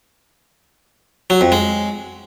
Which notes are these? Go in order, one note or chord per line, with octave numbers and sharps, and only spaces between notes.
F#3
F2
G#3